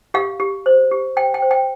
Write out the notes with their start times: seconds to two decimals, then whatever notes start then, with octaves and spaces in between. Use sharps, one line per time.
0.14 G4 F5
0.40 G4
0.66 C5
0.91 G4
1.16 C5 G5
1.34 G5
1.42 C5
1.51 G5